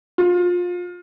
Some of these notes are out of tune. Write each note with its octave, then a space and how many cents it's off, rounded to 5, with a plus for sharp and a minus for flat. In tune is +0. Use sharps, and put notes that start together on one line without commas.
F4 +25